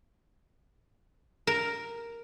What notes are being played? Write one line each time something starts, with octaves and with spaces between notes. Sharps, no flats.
A#4